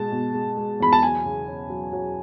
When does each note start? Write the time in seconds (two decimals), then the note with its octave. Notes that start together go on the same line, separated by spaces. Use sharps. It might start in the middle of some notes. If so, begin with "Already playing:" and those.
Already playing: B2 G#3 A5
0.12 B2
0.34 G#3
0.57 G#3
0.80 E2 B5
0.93 A5
1.03 F#3 G#5
1.25 C#3
1.47 C#4
1.70 F#3
1.93 F#3